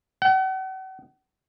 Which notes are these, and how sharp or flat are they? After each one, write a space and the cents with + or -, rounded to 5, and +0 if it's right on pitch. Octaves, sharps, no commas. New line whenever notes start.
F#5 +40